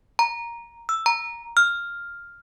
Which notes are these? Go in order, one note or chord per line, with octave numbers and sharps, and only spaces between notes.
A#5
E6
A#5
F6